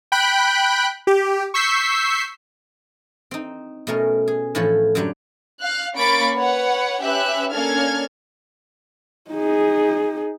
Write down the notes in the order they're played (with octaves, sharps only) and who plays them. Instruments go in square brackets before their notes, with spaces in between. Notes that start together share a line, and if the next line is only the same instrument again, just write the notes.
[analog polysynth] G5 B5 F#6
G4
C#6 E6 G6 B6 C7
[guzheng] C4 D#4
B2 A3 C#4 A#4
G#4
A2 E3 F3 E4 A4 C#5
F#2 D3 F#3 G3 D4
[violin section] F5 F6 F#6
A#3 C#4 B5 C#6 A6 D7
B4 C#5 F#5
C#4 G4 B4 E5 F#6
A#3 C#4 D4 A4 F6 G#6
[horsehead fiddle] D#4 G#4